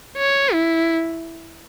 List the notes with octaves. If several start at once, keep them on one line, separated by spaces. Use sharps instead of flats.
C#5
E4